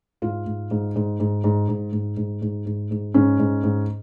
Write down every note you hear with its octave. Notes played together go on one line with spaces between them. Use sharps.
G#2 F4
G#2
G#2
G#2
G#2
G#2
G#2
G#2
G#2
G#2
G#2
G#2
G#2 C#4
G#2
G#2